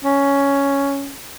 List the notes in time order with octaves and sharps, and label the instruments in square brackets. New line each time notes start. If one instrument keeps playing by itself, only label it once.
[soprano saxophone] C#4